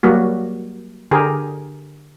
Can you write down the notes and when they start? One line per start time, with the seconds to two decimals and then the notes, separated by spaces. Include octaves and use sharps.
0.03 F#3 G3 A#3 F#4
1.11 D3 G4 G#4 A#4